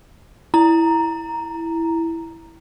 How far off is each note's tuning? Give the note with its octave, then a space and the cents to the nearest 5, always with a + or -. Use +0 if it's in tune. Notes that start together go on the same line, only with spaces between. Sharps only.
E4 +0 A#5 +0